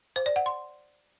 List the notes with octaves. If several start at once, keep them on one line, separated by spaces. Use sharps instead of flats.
C5
D5
F#5
C6